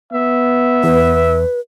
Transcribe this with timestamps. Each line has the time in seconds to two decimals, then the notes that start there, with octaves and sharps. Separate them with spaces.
0.13 B3 E5
0.84 E2 B4